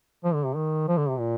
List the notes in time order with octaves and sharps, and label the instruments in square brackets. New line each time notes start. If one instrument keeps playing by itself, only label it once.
[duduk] F3
D3
C3
D#3
F3
D3
C3
A#2